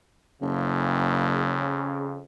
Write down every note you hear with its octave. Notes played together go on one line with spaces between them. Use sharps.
F#1 F2 C#3